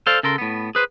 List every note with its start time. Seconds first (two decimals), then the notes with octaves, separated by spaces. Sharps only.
0.07 A4 C5 D5 F5
0.23 C#3 A4 A#4 C6
0.38 A2 B3
0.75 G#4 B4 C5